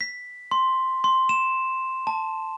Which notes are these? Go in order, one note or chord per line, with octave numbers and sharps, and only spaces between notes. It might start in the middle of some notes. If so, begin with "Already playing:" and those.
B6
C6
C6
E7
A5